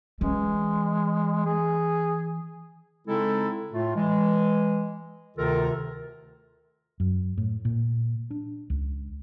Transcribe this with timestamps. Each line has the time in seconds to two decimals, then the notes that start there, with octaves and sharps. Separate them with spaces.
0.21 E3 G#3 C#4
1.46 G#4
3.08 C#3 G#3 C4 D#4 E4 A4
3.73 A2 A3 F4
3.96 E3 G#3
5.37 D2 C3 D#3 F4 A4 A#4
7.00 F#2
7.38 A2
7.65 A#2
8.31 D4
8.70 C#2